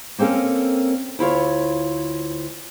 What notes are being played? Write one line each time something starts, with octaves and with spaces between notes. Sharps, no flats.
A#3 C4 C#4 A4 A#4
D2 E4 F4 C#5